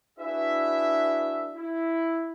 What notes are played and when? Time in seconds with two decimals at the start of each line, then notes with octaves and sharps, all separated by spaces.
0.19 D4 E4 F#4 G#4 B4 E5
1.55 E4